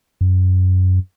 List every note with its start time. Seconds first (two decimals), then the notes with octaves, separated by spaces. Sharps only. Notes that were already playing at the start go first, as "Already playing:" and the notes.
0.21 F#2